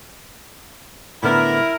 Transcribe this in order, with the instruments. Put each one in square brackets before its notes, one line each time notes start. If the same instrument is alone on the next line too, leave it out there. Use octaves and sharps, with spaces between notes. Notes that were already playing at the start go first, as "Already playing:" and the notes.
[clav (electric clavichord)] A2 D3 B3 [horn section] E4 A#4